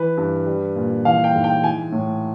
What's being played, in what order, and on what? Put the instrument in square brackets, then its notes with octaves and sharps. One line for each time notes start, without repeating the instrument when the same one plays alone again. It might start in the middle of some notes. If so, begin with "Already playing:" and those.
Already playing: [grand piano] E3 B4
G2
G3
A#2
E3 F5
G5
G#2
G5
E3 G#5
A2